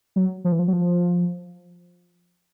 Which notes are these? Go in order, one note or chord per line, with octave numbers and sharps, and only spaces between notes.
F#3
F3
E3
F3
F#3
F3